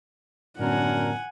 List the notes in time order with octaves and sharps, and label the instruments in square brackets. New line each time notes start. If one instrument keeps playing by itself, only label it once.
[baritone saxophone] F#2 [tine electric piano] A2 D3 B3 [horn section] D4 A#4 [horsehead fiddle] F#5 G#5